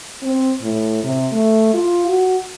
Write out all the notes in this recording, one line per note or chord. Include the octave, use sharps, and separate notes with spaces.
C4
A2
C3
A3
F4
F#4